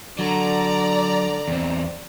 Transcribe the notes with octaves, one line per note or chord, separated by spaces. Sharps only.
D3 F#3 D5 A#5
E2 C4